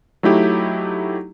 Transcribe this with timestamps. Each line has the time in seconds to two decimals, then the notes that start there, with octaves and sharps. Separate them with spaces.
0.23 F#3 A3 D#4 E4 G4